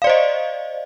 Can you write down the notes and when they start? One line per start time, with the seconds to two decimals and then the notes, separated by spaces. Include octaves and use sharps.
0.02 F5
0.04 D5
0.07 C5
0.09 D#5